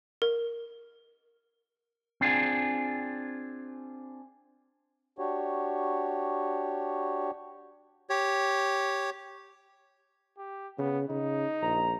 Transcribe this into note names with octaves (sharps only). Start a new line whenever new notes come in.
A#4
C4 D4 F4 G#4
D4 F#4 G4 C#5
G4 C#5
G4
C#3 B3
C#3 D#4
A#1 A#5